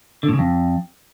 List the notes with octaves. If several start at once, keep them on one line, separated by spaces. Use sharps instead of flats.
D3
A2
C#3
F2